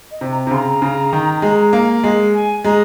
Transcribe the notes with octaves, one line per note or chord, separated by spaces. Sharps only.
D#5
C3
A#5
C3
C#3 C6
A#5
C#3
D#3
G#3
A#3
G#3
G#5
G#3 A#5